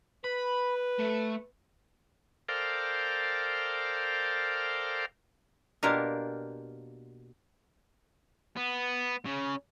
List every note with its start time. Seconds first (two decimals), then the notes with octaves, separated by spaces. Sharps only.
0.24 B4 B5
0.99 A3
2.48 A4 A#4 C5 D5 F5 G5
5.83 B2 A#3 D4 F4 G4 A#4
8.57 B3
9.26 C#3